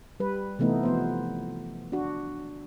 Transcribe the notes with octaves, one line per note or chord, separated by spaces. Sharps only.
G3 B4
C3 E3 A3 B3 D#4
F3 B3 C5
D4 F#4